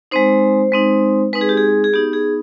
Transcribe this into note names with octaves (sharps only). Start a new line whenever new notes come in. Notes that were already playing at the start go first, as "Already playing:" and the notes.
G#3 C4 D#4 C5
G#3 C4 D#4
G#3 C4 D#4 B4
G#4
G4
G#4
G#4
B3 D#4 G4
G#4